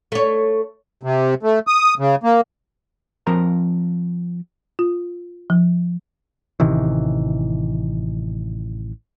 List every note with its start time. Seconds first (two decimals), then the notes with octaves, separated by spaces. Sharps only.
0.12 A3 C#5
1.03 C3
1.43 A3
1.67 D#6
1.99 C#3
2.23 A#3
3.27 F3 C4 A#4 A#5
4.79 F4
5.50 F3
6.60 A1 C3 D#3 E3